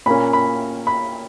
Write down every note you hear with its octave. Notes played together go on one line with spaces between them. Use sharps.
A#2 A#3 C#4 B5
B5
B5